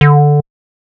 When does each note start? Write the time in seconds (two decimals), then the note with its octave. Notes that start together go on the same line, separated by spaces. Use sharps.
0.01 D3